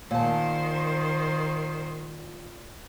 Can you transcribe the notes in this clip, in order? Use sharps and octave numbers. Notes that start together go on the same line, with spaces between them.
A#2 D#3 C5 A5